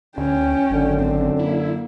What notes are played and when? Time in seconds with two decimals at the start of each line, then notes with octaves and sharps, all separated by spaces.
0.18 D2 C#4 G5
0.71 G#1 F#2 D3
1.01 C4
1.39 A#3 E4